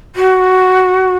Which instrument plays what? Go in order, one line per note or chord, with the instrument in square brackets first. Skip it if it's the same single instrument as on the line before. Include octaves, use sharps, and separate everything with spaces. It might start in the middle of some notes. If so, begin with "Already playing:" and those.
[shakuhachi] F#4